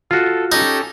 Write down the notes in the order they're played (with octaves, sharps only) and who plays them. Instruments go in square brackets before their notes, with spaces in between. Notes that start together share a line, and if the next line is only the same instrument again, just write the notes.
[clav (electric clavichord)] F4 F#4 [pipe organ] A4
[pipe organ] C#4 G4 A4 [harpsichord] D#4